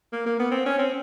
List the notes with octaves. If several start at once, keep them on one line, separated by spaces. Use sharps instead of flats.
A#3
A#3
B3
C4
C#4
C4